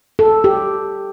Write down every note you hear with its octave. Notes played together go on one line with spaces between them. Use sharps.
A4
G4